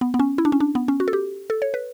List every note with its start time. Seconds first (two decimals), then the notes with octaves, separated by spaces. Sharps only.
0.01 B3
0.14 B3
0.19 C#4
0.38 E4
0.45 D4
0.52 C#4
0.60 D4
0.75 B3
0.88 C#4
1.00 F#4
1.08 A4
1.13 G4
1.50 A4
1.62 C#5
1.74 B4